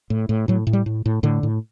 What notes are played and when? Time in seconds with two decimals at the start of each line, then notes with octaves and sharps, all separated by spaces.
0.10 A2
0.29 A2
0.48 A2 F#3
0.67 A2
0.73 G3
0.86 A2
1.06 A2
1.23 A2 D3
1.43 A2